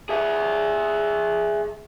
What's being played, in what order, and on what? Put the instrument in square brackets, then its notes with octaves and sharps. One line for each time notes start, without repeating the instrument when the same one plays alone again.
[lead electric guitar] G#4 E5